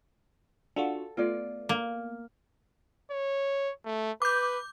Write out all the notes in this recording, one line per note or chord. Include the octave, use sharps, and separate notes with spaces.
D4 F4 F#4 A4
A3 B3 F4 D5
A#3
C#5
A3
B4 D6 G6